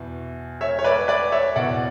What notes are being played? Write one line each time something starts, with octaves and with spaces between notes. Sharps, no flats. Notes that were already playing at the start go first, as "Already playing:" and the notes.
Already playing: E2 B2
C#5 E5
C#5
B4 D5
B4 D5
C#5 E5
E2 B2 D5 F#5